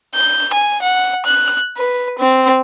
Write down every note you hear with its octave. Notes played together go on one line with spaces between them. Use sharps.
G6
G#5
F#5
F#6
B4
C4